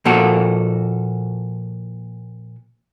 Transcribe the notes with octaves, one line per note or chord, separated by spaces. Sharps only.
A#2 F3 A#3 F#4 A4